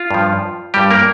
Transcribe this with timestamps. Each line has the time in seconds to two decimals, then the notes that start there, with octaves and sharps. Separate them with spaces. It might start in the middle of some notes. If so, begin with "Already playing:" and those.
Already playing: F4
0.11 G2 F3
0.74 G2 G3 G4
0.91 A#3 A#4